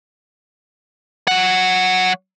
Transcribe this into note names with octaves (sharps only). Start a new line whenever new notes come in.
F#3 F#5